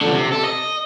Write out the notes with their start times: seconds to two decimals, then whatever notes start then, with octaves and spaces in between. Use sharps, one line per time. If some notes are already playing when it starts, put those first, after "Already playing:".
0.01 F2 D3
0.13 C3
0.32 A4
0.45 D#5